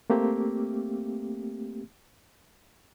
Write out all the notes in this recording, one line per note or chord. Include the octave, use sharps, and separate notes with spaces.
A3 A#3 C4 G4